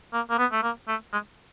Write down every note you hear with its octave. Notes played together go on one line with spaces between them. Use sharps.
A#3
A#3
B3
A3
A#3
A3
G#3